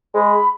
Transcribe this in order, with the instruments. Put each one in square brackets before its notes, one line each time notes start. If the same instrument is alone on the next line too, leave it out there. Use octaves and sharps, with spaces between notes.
[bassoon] G#3 [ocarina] B5